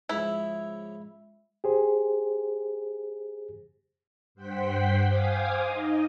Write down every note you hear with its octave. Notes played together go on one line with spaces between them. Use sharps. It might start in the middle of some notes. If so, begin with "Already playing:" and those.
G#2 C#3 F3 E4
G4 G#4 C5
G2 C5 F#5 G5 C6 B6
C5 F5 G#5 D6 D#6
D#4 D#5